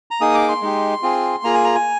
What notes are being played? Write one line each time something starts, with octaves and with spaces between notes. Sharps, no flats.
A#5
A#3 D#4 G#4 D#6
D6
C6
G#3 D#4 G4
C4 F4 G#4
A#3 F4 G#4 A#5
G#5
A#5
G#5